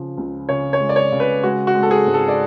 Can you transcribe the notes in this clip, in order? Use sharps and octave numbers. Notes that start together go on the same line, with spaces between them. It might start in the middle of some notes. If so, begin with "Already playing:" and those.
Already playing: C#3 F3
C#2
C#3 C#5
C#5
G#3
D5
C#5
C#3
B4
G#3 F#4
F#4
G#3
A4
G#4
G#2
A4
D5